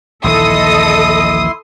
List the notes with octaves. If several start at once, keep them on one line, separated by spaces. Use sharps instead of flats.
A#1 D#2 E3 E4 A4 D#5 C6 D#6